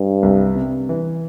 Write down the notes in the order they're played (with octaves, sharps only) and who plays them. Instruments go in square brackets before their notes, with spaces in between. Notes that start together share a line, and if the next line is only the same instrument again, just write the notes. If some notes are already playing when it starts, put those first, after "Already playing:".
Already playing: [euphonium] G2
[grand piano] C2
C3
E3